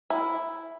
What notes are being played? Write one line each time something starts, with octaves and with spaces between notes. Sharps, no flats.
E4